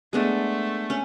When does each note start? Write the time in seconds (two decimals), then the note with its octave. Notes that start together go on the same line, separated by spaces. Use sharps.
0.13 G#3 A3 B3 D4
0.90 C#4